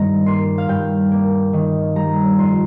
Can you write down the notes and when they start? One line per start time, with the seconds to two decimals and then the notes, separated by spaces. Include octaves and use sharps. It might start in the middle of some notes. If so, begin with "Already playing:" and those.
Already playing: G2 D#3 A#5
0.26 A#3 C6
0.58 F5
0.69 G2 G5
1.11 A#3
1.53 D#3
1.95 G3 A#5
2.38 F2 C6